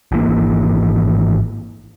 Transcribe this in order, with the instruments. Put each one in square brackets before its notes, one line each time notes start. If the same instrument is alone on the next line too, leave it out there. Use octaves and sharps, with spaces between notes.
[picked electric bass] G#1 E3 A#3